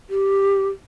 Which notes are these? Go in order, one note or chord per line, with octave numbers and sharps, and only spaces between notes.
G4